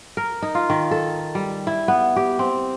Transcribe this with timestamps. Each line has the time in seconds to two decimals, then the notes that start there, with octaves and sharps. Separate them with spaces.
0.17 A#4
0.42 D#4
0.55 F4
0.70 D#3
0.91 A4
1.35 G3
1.67 E4
1.88 B3
2.16 G4
2.39 C4